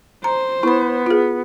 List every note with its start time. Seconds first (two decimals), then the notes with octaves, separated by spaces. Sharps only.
0.24 C5 A#5
0.63 B3 E4 B5
1.06 F4 G#4